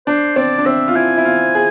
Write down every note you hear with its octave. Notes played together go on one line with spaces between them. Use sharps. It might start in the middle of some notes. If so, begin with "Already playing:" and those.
D4 C5
C4 D5
D4
C4 E5
F4
E4 G#5
E4
F4
G#4